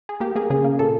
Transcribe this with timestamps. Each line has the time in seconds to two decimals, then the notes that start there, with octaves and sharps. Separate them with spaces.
0.09 G#4
0.20 A#3 G4
0.35 A#3 G#4
0.50 C#3 G#4
0.64 A#3
0.79 A#2 A4